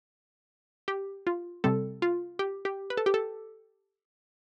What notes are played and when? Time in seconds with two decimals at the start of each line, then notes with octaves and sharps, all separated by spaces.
0.88 G4
1.27 F4
1.64 C3 G3 C4 A4
2.02 F4
2.39 G4
2.65 G4
2.90 B4
2.97 A4
3.06 G4
3.14 A4